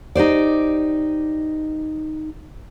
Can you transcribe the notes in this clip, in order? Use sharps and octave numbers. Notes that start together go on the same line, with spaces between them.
D#4 G4 C5 D5